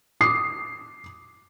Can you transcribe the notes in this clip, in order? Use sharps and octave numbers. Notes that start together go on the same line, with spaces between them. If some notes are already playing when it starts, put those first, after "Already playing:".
D6 D#6 C7